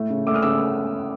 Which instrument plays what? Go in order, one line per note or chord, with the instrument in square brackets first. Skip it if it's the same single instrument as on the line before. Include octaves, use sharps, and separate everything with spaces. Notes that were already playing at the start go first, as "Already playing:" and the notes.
Already playing: [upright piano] A2 A3
C#3
A3 D6 E6
D#6 F6
C#3 D6 E6